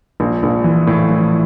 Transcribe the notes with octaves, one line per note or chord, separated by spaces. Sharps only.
A#1
A#1
E3
A2
E3